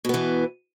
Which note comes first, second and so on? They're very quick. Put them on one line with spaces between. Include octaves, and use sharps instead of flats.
B2 B3 E3